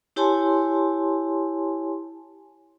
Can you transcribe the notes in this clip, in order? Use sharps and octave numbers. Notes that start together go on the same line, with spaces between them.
E4 G4 C#5 G#5 A5 C6